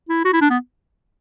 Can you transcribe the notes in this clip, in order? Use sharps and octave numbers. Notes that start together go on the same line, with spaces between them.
E4
F#4
E4
D4
B3